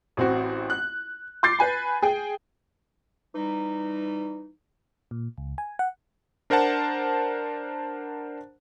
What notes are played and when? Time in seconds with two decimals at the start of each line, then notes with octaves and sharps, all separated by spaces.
0.17 A1 C4 F#4
0.70 F#6
1.43 C6 D6 G6 A6 C7
1.59 B4 G#5 B5
2.02 G#4 G5
3.35 E3 G3 D#4
5.11 A#2
5.38 C#2
5.58 G#5
5.79 F#5
6.50 D4 A#4 C5 F#5 A5